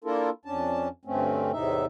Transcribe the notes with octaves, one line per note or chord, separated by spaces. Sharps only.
A#3 D4 E4 F4 A4 A#4
F2 C#4 D4 A5
D2 G2 A3 C4 C#4
E2 A2 C3 D#4 E5